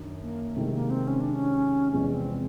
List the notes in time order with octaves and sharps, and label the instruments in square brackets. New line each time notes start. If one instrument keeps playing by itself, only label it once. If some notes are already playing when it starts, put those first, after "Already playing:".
Already playing: [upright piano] F#2 D#3 D4
[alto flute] A#3
[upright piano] C3 D#3 G#3 [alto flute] A3
[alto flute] A#3
C4
C#4
D4
C#4
[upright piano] E2 C3 F3 G#3 [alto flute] C#4
[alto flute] C#4
C4